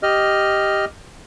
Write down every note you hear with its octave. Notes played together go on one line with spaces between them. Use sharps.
G4 D#5 F6